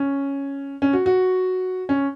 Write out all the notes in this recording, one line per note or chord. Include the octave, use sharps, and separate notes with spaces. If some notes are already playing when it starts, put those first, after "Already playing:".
Already playing: C#4
C#4
F#4
F#4
C#4